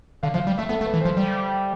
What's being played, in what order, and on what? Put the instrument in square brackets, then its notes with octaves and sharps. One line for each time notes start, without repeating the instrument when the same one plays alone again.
[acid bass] D3 [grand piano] F5
[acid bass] F3 [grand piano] F5
[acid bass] G3
[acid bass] A3 [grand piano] E5
[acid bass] B3 [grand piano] A4
[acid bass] A3
[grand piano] B4
[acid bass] E3
[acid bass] F3 [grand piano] C5
[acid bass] G3